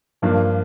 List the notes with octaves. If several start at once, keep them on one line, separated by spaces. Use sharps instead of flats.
G2 F3 A#3 D4